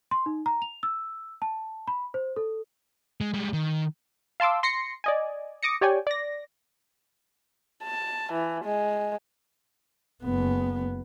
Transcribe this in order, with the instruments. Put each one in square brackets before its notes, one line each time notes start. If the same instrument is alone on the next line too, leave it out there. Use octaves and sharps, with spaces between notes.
[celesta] C6
D#4
A#5
F7
E6
A5
B5
C5
A4
[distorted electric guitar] G#3
G3 G#3
D#3
[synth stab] F5 A5 C6 D6 E6
C6 A#6 C7 C#7
D5 D#5 G#5
D6 D#6 A#6 C#7
G4 C#5 D5 G5 G#5
D5 A#6
[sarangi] A5
E3
G#3
[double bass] F#1 B3